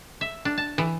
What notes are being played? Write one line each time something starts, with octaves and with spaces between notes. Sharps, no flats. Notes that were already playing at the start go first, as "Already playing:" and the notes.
E5
D4
A5
E3